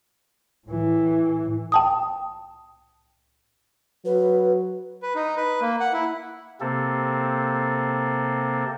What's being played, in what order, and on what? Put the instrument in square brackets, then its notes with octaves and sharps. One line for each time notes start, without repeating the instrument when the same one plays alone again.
[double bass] A2 E3
[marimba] G5 A5 D#6
[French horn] F#3 [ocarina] B4
[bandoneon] B4
D#4
B4
A#3
F#5
E4
[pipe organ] C3 A#3 C4 A4